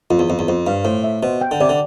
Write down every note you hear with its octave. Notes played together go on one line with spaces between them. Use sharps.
F2 F4
E2
F2 C5
E2
F2 C5
G2 F5
A2 C5
E5
B2 C5
G5
D3
C3 D5
D3